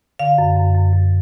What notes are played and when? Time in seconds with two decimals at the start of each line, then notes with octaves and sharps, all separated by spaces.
0.19 D3 F5
0.38 F#2
0.56 F#2
0.75 F#2
0.93 F#2